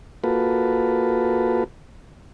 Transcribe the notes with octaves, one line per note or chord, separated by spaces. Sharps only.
A#3 F4 F#4 A4 B4